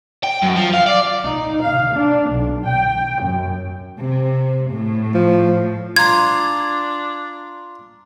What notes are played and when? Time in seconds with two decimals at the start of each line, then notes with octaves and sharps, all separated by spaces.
0.24 G5
0.43 F#2
0.57 F3
0.74 F5
0.87 D5
1.25 D#4
1.63 F5
1.94 D4
2.30 B1
2.67 G5
3.23 F#2
4.00 C3
4.71 A2
5.14 F3
5.96 D4 F4 A#5 C6 G#6